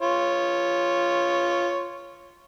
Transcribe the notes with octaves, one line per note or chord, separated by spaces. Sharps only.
F4 C#5